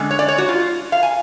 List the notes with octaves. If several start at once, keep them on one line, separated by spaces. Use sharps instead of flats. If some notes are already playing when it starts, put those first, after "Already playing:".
Already playing: D3 G#3 C#4
C#5
D5
C#5
F#4
F4
F5
G#5